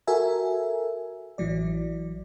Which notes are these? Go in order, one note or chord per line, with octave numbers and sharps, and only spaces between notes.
F#4 A4 A#4 E5 G#5
A1 E3 F#3 D5